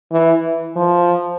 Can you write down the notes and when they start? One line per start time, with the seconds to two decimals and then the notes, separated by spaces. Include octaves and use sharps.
0.11 E3
0.76 F3